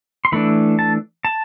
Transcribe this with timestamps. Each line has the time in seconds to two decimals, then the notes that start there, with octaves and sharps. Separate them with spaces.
0.25 C6
0.32 E3 A3 D4 B5
0.79 A5
1.25 A5